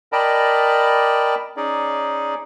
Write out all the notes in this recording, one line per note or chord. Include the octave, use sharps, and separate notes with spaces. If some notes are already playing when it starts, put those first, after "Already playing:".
A#4 D5 D#5 G5 A5 B5
C#4 D#4 G#4 D5